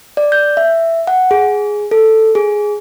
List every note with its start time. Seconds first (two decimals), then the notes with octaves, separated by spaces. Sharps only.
0.17 D5
0.32 G6
0.57 E5
1.07 F#5
1.31 G#4
1.91 A4
2.35 G#4